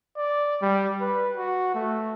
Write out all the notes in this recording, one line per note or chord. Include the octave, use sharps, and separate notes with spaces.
D5
G3
B4
F#4
A3